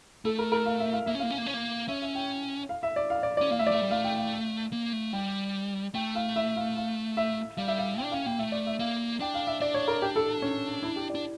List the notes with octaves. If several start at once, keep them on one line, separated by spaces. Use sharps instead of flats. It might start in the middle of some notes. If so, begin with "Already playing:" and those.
A3 A4
A#4
A#4
F5
E5
F5
A#3 E5
C#4
F5
A#3
C#4
A#3
C#4
A#3
C#4 E5
E5
G5
F5
E5
D5
F5
D5
D5
C#4
A#3 F5
A3 E5
D5
A3 E5
G3
A3 F5
G5
F5
A#3
A3
G3 G5
A3 G5
F5
E5
F5
F5
E5
G3 F5
E5
F5
G5
D4
C#4 F5
A#3 G5
A3 E5
D5
E5
A#3 F5
D4 G5
F5
E5
D4 D5
C#5
A#4
G4
A4
C#4
E4
G4
D5
D4